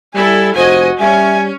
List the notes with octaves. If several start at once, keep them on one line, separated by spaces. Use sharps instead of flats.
G3 E4 A4 G#5
F1 F#4 C5 D#5 G#5
G3 C#4 E5 G#5